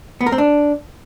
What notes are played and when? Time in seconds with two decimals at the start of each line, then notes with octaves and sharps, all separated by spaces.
0.21 B3
0.26 A#4
0.32 C4
0.38 D4